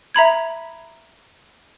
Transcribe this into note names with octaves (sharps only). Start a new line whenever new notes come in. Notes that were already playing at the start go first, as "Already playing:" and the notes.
E5 A#5 B5 G#6